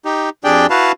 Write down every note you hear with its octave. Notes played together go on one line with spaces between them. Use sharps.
D#4 G4
F2 D4 G4 G#4 D5 G5
E4 F#4 B4 F5 A5